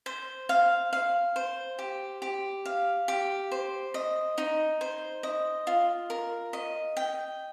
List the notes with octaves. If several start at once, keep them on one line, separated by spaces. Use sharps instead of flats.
C5
F5
F5
C5
G4
G4
F5
G4
C5
D#5
D#4
C5
D#5
F4
A#4
D#5
G5